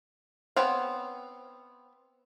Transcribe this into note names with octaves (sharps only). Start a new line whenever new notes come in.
B3 C4 C#5 F5